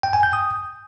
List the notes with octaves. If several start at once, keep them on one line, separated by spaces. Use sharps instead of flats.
G5
G#5
G6
D#6